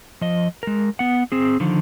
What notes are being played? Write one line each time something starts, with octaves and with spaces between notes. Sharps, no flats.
F3 D#5
G#3 A#4
B3 F#5
C4 G#4
D3 D#3 F3